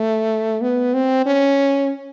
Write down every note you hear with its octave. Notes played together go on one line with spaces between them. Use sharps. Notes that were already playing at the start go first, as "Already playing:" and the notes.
Already playing: A3
B3
C4
C#4